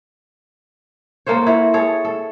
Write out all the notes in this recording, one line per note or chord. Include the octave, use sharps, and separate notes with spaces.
A#3 A4 C5 C#5
E4 F#4 C#5
G#4 A4 C#5
A4